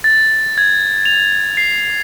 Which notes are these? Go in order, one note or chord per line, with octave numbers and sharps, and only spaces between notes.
A6
G#6
F7
C7